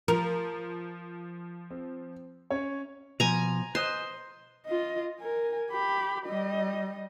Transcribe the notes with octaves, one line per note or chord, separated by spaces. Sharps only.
F3 A#4
C4
C#4 C#5
B2 F3 G#5 A#5
B4 C5 D#5 C6
F4 D#5
A#4 G#5
G4 B5
G3 D#5